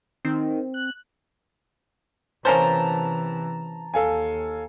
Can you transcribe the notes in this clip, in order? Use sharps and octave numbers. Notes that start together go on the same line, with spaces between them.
D#3 C4
F#6
C3 E3 A#3 C#4 C5 A5 A#5
D#2 A4 F5 G#5